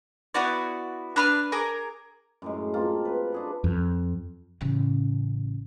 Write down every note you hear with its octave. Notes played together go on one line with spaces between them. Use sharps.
B3 E4 F#4 D5
D4 B4 F6
G#4 A#4 D6
F#2 A2 G#3
A#3 C4 F4 A4
B4
D4 G#4 A4
F2
A1 C#3